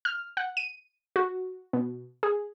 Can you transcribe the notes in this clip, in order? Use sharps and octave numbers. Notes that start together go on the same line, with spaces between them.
F6
F#5
D#7
F#4
B2
G#4